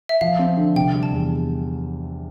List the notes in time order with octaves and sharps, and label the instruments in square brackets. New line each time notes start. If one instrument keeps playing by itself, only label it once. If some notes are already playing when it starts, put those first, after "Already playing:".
[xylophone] E5
[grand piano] F3 [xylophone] F5
[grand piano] C4
D3
[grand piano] C3 [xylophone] G5
[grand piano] G3
[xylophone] A5
[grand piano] E2